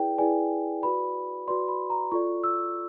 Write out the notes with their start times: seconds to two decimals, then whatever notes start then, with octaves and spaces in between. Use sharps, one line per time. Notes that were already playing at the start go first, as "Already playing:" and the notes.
Already playing: E4 G#4 B4 D5 G5
0.18 E4 G#4 B4 D5 G#5
0.82 F#4 B4 D5 B5
1.48 F#4 B4 D5 C6
1.68 B5
1.90 A#5
2.12 F4 A4 D5 C#6
2.44 E6